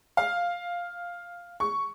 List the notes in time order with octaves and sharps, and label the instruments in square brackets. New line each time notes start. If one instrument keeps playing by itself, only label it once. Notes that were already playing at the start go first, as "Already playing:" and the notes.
[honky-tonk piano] F5
C#6